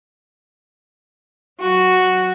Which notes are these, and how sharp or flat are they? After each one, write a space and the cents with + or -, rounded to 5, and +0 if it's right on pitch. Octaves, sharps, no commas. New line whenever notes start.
F#3 +0 F#4 +0